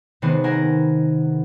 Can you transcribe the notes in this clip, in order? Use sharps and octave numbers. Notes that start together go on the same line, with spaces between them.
C3 D#3 G#3 B3 C4
C4 A#4 D#5 F#5 G#5